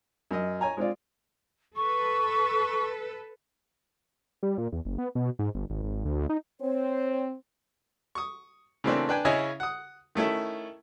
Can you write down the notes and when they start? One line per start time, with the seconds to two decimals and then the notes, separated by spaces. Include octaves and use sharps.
0.31 F#2 D#5
0.61 C#5 G#5 A#5
0.77 G#3 C4 F4 D5
1.76 A4 B4 C#6
4.43 G3
4.58 A#2
4.72 E2
4.85 F#1
4.98 B3
5.15 B2
5.39 G#2
5.55 G1
5.70 G#1
5.83 G#1
6.05 D2
6.29 D#4
6.61 C4 C#5
8.15 C#6 D#6
8.84 C#3 E3 A3 A#3 C4 D4
9.09 D4 B4 G5 G#5
9.25 C#3 E4 C#5 D#5 G#5
9.60 F#5 D#6
10.15 D#3 A3 C#4 E4